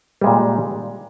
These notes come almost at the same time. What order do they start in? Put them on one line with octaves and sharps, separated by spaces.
G3 G#3 A#2